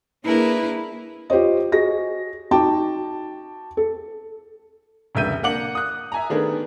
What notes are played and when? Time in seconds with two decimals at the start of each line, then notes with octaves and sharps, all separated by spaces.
0.25 A#3 D4 E4 G#4 A#4 B4
1.30 F4 G4 C5 C#5 D#5
1.72 F#4 G#4 D#5 A#6
2.51 D#4 F#4 G5 A5 D6
3.77 A4
5.15 F1 C#2 D3 E5 G6 D#7
5.43 A#3 D4 F#5 D6 F#7
5.75 D#6 F#6
6.12 E5 G#5 A#5
6.30 D#3 A3 B3 D4 G#4 A#4